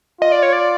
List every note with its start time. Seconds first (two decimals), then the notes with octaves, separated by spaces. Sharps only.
0.21 F4 D#5
0.32 D5
0.43 C#5
0.53 D5